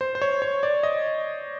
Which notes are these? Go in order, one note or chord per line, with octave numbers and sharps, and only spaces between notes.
C5
C5
C#5
C#5
D5
D#5